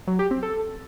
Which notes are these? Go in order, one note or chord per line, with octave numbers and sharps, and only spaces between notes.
F#3
G4
C4
A4